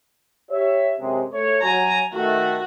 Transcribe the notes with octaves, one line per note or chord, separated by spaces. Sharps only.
G4 C#5 E5
F#2 C3 G#3
A3 C#5
F#3 G#5 A#5
D#3 A3 F#4